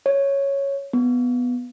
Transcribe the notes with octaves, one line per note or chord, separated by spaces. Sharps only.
C#5
B3